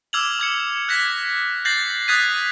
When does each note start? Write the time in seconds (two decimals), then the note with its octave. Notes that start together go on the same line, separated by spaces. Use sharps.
0.13 D6 E6 F6 G#6 F7 F#7
0.39 D6 G#6 C#7
0.88 F#6 G#6 A#6 B6
1.65 G6 A6 A#6 C7 F#7
2.08 D#6 F#6 G#6 A6 B6 D#7